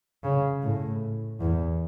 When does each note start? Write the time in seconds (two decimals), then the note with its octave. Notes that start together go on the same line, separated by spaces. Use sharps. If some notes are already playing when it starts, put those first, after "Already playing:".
0.24 C#3
0.63 A2
1.40 E2